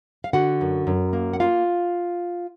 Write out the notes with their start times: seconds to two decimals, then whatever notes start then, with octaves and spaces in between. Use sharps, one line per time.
0.24 F5
0.33 D3 F#4 F#5
0.61 F#2
0.87 F#2
1.13 A#3
1.33 F#5
1.40 A#3 F4 F5